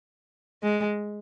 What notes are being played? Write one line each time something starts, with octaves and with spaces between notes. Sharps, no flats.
G#3